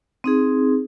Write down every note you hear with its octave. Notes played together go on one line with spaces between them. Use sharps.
C4 D#4 G#4